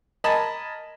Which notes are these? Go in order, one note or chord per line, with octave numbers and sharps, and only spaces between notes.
A#4 D#5 G#5 A5 B5